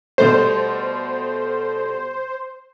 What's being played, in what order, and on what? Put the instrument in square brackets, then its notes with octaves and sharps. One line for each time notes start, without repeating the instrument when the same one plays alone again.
[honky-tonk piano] B2 G3 A3 [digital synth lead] C5